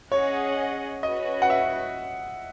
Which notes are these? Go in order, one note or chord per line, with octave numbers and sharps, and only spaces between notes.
C#4 G#4 C#5 D#5 F#5
C#4 F#4 B4 D#5
F#5
E5